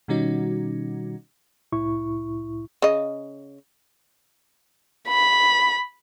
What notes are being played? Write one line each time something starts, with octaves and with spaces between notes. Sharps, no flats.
B2 D#3 G3 C#4 D#4 F#4
C2 A2 E4 C#6
C#3 D#5
B5